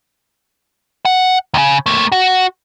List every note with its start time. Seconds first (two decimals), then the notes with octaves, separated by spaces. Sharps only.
1.05 F#5
1.54 D#2 C#3
1.86 A3 A#3
2.12 F#4